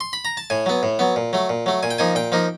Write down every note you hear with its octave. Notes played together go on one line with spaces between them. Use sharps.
C6
B5
A#5
A5
A2 G#5
F#3 B3
A2
F#3 B3
A#2
F#3 A3
A#2
F#3 A3
A#2 G#5
G5
F3 A#3 D#4 G#5
A#2 G5
F3 A#3 D#4